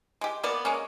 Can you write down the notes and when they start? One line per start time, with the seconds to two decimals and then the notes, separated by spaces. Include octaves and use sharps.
0.21 G#3 G4
0.43 A#3 B3 D5
0.65 G#3 A#3 C#4